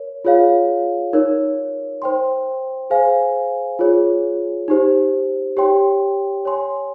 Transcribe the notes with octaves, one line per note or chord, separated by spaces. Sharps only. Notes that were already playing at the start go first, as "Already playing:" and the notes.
Already playing: A#4 C#5
F4 G#4 C#5 F5
D#4 A#4 C#5
C5 G5 C6
G#4 C5 F5 G#5
F4 G#4 C#5
D#4 G4 C5
G4 C#5 G5 C6
C#5 G#5 C6